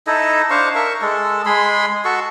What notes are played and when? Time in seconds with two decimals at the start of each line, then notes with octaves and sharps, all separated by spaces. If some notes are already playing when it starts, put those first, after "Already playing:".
0.07 D#4 E4 A4 D#5
0.50 D4 C5 F5 C#6
0.75 A#4 E5 C#6
1.02 G#3 A4
1.46 G#3 G#4 B5 C6
2.05 F#4 A4 C#6